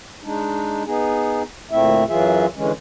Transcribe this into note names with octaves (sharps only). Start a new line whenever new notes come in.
G#3 D4 D#4
B3 D#4 G#4
D2 A#2 A3 C4 E4 E5
F#2 E3 F#3 F4 G#4 E5
D3 E3 G#3 C#4